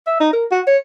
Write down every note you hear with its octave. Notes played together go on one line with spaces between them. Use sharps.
E5
D#4
A#4
F#4
C#5